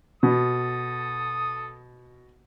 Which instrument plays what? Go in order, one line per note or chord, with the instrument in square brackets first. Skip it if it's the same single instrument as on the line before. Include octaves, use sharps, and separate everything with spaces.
[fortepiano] B2 [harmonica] A4 D#6